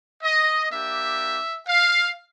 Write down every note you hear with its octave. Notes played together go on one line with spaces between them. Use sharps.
D#5
A#3 D4 G4 E5
F5